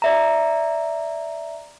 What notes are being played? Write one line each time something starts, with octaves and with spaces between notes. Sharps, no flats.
D5 E5 A#5